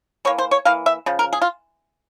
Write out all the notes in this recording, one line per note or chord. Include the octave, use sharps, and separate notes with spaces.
E3 A#3 C#5
C5
C#5
E3 A#3 F5
E5
C#3 F3
A#4
G#4
F4